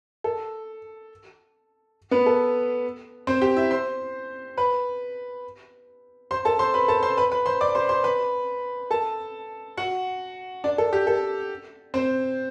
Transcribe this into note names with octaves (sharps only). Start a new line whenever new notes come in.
A4
B3 B4
A4
C4 C5
G4 G5
E4 E5
C5 C6
B4 B5
C5 C6
A4 A5
C5 C6
B4 B5
A4 A5
C5 C6
B4 B5
B4 B5
C5 C6
D5 D6
C5 C6
C5 C6
B4 B5
A4 A5
F#4 F#5
D4 D5
A4
G4
A4
C4 C5